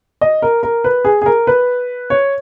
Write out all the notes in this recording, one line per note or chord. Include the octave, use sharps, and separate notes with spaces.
D#5
A#4
A#4
B4
G#4
G#4
A#4
B4
C#5